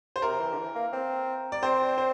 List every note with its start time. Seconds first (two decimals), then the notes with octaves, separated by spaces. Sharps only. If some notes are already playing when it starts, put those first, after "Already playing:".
0.16 C5
0.22 C3 A#4
0.40 E3
0.52 D3
0.58 E3
0.75 A#3
0.93 C4
1.52 D5
1.63 C4 C5
1.98 C5